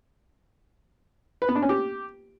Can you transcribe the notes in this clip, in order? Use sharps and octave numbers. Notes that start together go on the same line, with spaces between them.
B4
B3
D4
C#4
G4